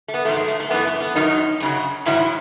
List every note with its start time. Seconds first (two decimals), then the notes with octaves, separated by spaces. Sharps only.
0.08 A3
0.14 B3
0.25 G#2 D#3 F#3 A3
0.37 G#3
0.48 A3
0.60 A3
0.70 F#2 E3 B3
0.85 A3
1.00 B3
1.15 F#2 D#3 F#3 D#4
1.60 F#2 C#3 F#3
2.06 G#2 D#3 F#3 E4